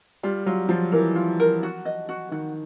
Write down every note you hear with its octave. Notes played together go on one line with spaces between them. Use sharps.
G3 F4
F#3 F4
F3 F4
E3 A#4
F4
A#4
F#4
D#5
F#4
D#3 F#4